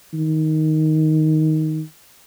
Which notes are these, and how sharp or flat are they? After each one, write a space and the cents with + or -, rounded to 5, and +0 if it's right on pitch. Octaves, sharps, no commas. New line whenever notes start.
D#3 +5